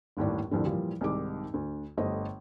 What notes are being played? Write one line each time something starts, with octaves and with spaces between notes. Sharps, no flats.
G1 D#2 A2 D5
C2 F2 A2 D3
A#2 E3 F3 G3
C2 G#2 D#3 D6
D2
G1 G3 A3 C5 D#5